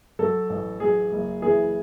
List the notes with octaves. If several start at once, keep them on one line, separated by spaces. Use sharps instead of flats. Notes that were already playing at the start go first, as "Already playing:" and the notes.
F#3 A4
A1
F#3 G#4
F#1
E3 G#4